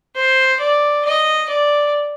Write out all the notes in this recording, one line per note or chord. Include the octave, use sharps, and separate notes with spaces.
C5
D5
D#5
D5